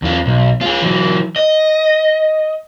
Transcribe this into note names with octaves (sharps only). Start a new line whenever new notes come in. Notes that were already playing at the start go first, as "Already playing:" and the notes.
E2 F4
B1
F4 G#4
E3 F#3
D#5